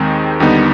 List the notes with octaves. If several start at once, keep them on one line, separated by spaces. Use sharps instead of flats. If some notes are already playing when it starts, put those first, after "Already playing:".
Already playing: D#2 D#3 G#3 C4 D#4
D#2 D3 G3 B3 D#4